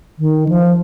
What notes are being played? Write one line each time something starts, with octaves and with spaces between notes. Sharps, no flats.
D#3
F3